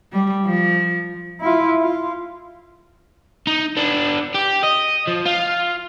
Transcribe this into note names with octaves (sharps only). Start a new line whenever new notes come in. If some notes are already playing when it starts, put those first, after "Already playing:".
G3
F3
E4 F4
F4
D#4
B3 D4
G4
D#5
F3
F4